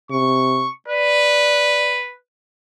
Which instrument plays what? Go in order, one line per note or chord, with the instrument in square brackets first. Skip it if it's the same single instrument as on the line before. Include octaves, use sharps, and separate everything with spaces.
[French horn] C3 [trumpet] C#6
[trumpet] B4 [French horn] D5